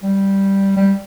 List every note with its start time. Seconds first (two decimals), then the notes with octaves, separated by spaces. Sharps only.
0.03 G3
0.77 G3